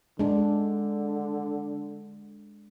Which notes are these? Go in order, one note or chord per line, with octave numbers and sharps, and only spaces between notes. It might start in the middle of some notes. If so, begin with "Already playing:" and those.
D3 G#3 D4